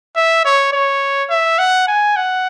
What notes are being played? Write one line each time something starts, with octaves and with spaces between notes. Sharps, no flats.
E5
C#5
C#5
E5
F#5
G#5
F#5